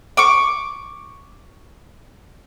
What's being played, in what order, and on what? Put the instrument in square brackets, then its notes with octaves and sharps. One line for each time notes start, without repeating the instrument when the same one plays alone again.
[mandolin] C#6 D6